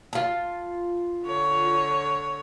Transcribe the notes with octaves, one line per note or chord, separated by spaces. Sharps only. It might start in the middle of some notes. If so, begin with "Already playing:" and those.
F4 A5
D3 C#5